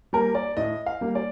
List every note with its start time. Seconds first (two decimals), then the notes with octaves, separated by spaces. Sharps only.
0.13 G3 A#3 A#4
0.35 D5
0.57 A2 D#5
0.86 F5
1.01 G3 A#3
1.15 D5